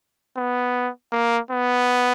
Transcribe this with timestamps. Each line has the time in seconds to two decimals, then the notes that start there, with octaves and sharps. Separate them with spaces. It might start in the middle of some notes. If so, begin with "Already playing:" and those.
0.37 B3
1.13 A#3
1.51 B3